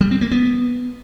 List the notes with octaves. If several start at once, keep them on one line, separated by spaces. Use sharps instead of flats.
G3
C4
A#3
B3